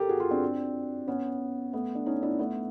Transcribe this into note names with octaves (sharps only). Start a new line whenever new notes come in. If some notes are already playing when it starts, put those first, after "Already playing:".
Already playing: G4 A4 A#4
F#4 G#4
F4 G4
C4 D4
B3 C#4
A3 B3
D4
C#4 D#4
D4 E4
A3 B3